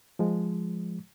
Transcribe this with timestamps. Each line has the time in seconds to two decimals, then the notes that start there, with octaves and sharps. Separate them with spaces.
0.19 F3 G#3